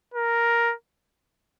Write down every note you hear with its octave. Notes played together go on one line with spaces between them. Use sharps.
A#4